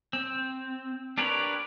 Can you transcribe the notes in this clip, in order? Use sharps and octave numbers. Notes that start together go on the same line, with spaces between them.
C4
D4 G4 A#4 B4 C#5